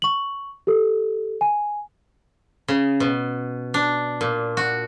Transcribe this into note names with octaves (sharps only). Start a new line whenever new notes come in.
C#6 F#7
G4 A4
G#5
C#3
B2
D4
A#2
F#4